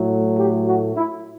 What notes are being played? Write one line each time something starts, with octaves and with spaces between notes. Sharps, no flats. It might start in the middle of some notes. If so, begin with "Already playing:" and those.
Already playing: A2 F#3 A3
G4
F#4
E4